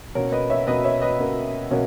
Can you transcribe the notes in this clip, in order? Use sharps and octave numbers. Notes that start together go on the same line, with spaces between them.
B2 A#3 C#4 A#4 C#5
B4 D#5
C#5 E5
B2 A#3 C#4 B4 D#5
C#5 E5
B4 D#5
B2 A#3 C#4
B2 A#3 C#4